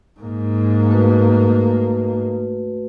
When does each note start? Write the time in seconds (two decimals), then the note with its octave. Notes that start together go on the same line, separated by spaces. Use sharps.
0.20 G#2 A#3
0.89 A3 F#4 B4